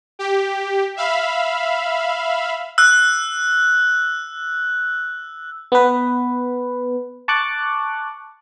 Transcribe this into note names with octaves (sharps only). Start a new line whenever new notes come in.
G4
E5 F5 B5
E6 F#6
B3 B4
A5 C#6 D6 F#6